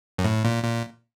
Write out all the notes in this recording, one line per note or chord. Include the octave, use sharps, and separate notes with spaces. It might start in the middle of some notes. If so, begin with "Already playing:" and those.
F#2
A2
A#2
A#2